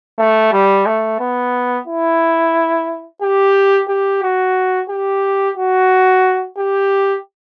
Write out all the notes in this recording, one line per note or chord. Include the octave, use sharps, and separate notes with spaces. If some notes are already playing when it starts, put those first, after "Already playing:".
A3
G3
A3
B3
E4
G4
G4
F#4
G4
F#4
G4